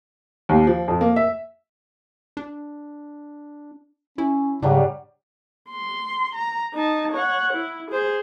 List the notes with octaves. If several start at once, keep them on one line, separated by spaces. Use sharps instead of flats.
D#2
F3
F2
A#3
E5
D4
C#4 E4
G#2 C#3 F#3 G3 D4
C6
A#5
D#4 A5
C#5 F#5
E4
G#4 C5